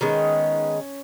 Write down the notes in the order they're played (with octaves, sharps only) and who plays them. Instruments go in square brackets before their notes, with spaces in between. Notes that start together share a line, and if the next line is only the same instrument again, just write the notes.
[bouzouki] D#3 G#3 B3 C#4